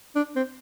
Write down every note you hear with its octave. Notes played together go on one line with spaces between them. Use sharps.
D4
C4